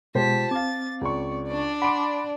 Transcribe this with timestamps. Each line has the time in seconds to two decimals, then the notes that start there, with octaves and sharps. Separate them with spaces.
0.15 B2 G#3 F4 G4 C5 A5 B6
0.51 C4 F5 D6 A6
1.01 C#2 D5 C#6
1.48 D4 D5
1.82 F#5 B5 C6 D6 D7